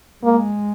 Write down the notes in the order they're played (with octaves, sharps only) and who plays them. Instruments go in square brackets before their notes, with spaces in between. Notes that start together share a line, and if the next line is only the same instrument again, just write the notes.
[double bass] G#3 [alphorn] A#3